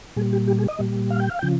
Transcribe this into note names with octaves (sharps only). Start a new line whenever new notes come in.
A#2 G3 G#4
G4
G4
G#4
D#5
A#2 G3
F5
G5
F5
C#3 F3 G5